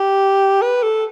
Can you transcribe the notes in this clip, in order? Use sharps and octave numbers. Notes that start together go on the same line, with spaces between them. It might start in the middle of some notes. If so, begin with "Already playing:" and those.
Already playing: G4
B4
A4